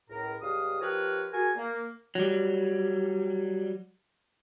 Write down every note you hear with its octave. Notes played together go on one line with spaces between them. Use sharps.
C#2 A2 A#4
C#2 G3 F5 D#6
F3 G4 A#4 B4 C#5 F6
F#4 G#4 A#4 G#5
A#3
F#3 G3